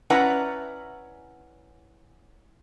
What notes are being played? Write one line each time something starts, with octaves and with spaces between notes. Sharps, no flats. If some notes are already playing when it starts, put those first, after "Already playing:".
C#4 E4 B4 D5 F#5 A#5